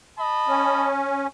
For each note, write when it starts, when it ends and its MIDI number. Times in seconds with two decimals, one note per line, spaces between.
0.19 0.90 75
0.19 0.90 81
0.19 0.90 83
0.48 1.27 61